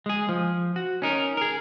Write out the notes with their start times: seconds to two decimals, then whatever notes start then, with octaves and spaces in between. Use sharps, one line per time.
0.06 G#3 G#4
0.29 F3
0.76 F#4
1.02 C#4 D#4 A#4
1.37 G#4 A#4